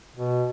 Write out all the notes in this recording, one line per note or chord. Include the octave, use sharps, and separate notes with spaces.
B2